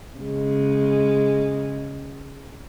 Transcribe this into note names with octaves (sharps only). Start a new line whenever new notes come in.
C#3 G#3